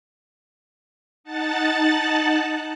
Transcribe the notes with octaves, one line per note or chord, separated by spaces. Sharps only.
D#4 F#5 A5 F#6 A6